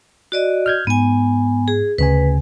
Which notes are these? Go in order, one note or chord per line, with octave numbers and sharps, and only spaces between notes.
F#4 D5 D#5
F6 G6 G#6
G#2 B3 G#5
G#4
D2 C#3 B4 G#5